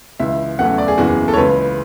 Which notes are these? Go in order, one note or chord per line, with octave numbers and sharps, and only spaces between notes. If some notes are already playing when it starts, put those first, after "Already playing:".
C#2 C#3 E3 E5
E2 C#3 F#3 A3 C#4 F#5
D5
G#4
F#1 E2 C#3 E3 F#4
G#4
A4
C#5
C#2 C#3 E3 B4